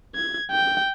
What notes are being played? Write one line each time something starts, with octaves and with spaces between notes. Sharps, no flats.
G#6
G5